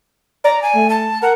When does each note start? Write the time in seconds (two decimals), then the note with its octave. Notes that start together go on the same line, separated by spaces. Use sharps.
0.44 D5 A#5
0.62 G#5
0.75 A3
0.90 A5
1.22 A#4 F#5